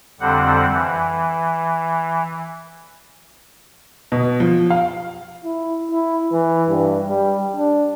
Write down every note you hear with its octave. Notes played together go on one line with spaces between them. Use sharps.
F2 D3 G3 C4 F#5
E3
B2
F3
F5
E4
E4
E3
G2
G3
D4